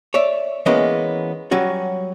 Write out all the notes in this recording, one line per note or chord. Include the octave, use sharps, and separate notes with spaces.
C#5 D5 E5
E3 G#3 A#3 B3 C#4
F#3 G3 C#4 F#4